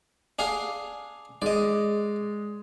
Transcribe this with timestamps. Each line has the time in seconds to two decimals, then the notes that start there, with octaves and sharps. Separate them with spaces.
0.39 D4 G#4 F5
1.42 G#3 D5 D#5